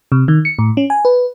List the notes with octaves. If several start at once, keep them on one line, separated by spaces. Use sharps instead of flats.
C3
D#3
C#7
A2
C#4
G#5
B4